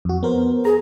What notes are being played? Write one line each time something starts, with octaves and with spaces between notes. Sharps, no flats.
F2 F#4
B3 A#4 C5
G#4 A#5